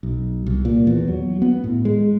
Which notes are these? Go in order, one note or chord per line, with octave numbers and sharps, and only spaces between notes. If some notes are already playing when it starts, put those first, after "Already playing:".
B1
C2
A#2
E2
F#3
B3
A2
G#3